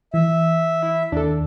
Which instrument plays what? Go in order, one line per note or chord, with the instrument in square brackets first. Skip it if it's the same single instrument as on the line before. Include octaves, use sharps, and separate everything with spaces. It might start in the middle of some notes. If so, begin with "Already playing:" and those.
[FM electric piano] E3 [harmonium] E5
[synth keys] E4
[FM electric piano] D#2 [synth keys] D4 A4